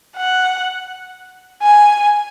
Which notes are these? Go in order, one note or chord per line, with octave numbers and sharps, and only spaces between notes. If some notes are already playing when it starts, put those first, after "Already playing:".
F#5
G#5